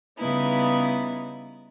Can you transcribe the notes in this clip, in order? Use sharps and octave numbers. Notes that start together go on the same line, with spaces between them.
C#3 G3 B3 D#4 E4 B4